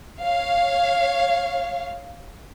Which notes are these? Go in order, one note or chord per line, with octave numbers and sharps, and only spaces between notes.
C#5 F5